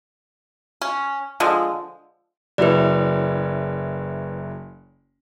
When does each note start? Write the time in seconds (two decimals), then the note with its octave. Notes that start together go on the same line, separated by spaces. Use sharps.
0.82 C#4
1.40 D3 F3 G#3
2.58 F#1 F#3 E4 B4 D5